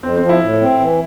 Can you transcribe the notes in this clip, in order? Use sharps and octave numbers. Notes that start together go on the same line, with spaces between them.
F2 C4
C4
F3
E4
A2
C4
E3